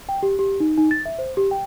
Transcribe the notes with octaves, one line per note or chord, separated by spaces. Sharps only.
G5
G4
G4
D#4
D#4
A6
E5
C5
G4
G5